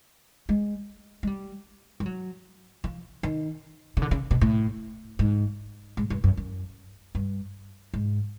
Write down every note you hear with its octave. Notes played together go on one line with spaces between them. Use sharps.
G#3
G#3
G3
G3
F#3
F3
D#3
C#3
D3
C#3
B2
A2
G#2
G#2
G2
F#2
F#2
G2
G#2